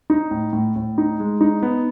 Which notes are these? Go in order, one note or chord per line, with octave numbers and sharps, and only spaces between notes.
D#4
A2
A2
A2
D#4
G#3
D#4
B3